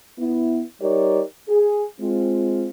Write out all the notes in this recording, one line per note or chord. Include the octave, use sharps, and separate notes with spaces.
B3 E4
G3 D#4 G4 A#4 C#5 D5
G#4
G#3 C4 F4